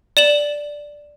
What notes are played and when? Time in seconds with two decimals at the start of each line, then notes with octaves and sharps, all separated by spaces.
0.17 D5 E7 F#7